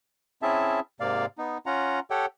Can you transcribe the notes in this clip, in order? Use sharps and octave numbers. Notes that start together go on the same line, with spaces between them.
C4 C#4 E4 G#4 E5 A5
G#2 C3 A#3 D5 F5
B3 D#4
C#4 F4 F#5 A#5
G4 A4 C#5 F#5 G5